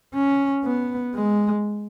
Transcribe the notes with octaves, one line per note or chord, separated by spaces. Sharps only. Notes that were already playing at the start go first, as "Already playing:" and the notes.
C#4
B3
G#3